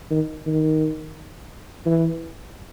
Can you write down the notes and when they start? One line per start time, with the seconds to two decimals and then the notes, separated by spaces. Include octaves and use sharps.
0.11 D#3
0.47 D#3
1.86 E3